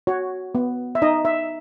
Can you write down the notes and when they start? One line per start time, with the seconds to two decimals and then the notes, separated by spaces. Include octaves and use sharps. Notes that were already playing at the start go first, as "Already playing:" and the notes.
0.07 F#4 C#5
0.55 B3
0.95 E5
1.02 D#4 D#5
1.25 E5